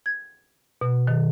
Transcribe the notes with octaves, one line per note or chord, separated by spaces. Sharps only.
G#6
B2
D#3